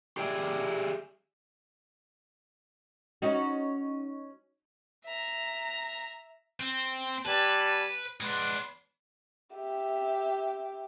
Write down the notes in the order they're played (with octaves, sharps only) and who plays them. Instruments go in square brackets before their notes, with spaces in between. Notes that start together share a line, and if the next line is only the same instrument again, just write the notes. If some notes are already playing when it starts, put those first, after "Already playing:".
[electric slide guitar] G4 G#4 D5 E5 G5 G#5
[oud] C#4 D#4 F#4
[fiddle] E5 A#5
[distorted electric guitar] C4
[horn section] G3 G#5 A5 [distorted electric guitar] B4
[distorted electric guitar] G#3 D4 [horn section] B4 F#5 C6
[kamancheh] G4 E5